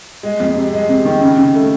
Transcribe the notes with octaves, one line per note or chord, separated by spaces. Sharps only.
G#3
F2
C3
G#3
C3
D#3
C#3
C#3
A3